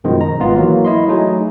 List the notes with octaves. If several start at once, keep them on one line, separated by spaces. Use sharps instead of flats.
F#2 B2 D#3 F3 G#3
A#5
G#1 G#3 B3 F4
E3 F#3 A#3
E4 D#5 C6
F#3 A3 D#4 G#4